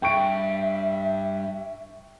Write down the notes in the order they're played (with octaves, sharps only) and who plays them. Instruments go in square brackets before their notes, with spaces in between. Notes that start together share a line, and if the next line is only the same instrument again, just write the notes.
[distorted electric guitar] G2 [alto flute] E5 [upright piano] G5 C#6 D7